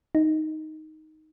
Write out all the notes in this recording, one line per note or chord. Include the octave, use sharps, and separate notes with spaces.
D#4